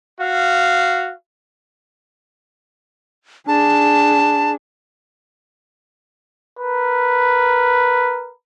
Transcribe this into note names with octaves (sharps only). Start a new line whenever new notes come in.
F#4 F5
D4 G#4 A5
A#4 B4